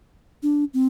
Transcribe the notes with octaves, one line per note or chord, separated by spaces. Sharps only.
D4
C4